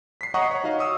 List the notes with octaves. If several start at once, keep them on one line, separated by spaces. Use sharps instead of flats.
B6 C7
C#5 D#5 F#5 A#5 C#6 D#6
C#5
D#4 F#4 D#5 F5
C#6 D#6 E6